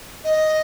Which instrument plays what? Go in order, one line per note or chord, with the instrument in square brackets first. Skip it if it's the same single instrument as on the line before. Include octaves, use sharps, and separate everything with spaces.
[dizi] D#5